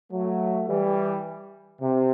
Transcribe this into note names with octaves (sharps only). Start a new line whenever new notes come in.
F#3 A3
E3 G3
C3